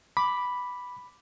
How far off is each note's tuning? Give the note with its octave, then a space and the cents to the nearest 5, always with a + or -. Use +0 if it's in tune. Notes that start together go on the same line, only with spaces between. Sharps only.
B5 +0 D6 +0